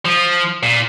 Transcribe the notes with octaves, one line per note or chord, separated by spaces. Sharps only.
F3
A#2